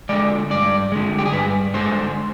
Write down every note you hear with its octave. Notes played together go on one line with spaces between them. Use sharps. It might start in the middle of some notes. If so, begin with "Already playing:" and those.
D3 G#3 D5
G2 D5
D3 G#3
G4
G#4
G2 B4
D3 G#3 C5